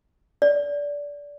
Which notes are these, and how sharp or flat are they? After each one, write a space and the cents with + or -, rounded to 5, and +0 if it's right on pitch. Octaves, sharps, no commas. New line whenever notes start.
D5 -20